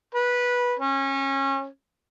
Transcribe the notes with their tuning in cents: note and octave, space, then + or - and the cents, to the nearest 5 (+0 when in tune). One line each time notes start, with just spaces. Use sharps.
B4 -15
C#4 -25